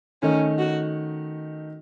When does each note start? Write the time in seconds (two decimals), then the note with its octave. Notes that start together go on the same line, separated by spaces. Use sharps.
0.23 D#3 A3 C#4 D#4
0.59 F#4